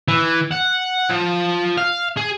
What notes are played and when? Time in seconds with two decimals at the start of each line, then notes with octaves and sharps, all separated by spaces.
0.08 E3
0.51 F#5
1.10 F3
1.78 F5
2.17 G#4